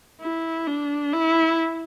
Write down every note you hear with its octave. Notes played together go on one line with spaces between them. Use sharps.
E4
D4
E4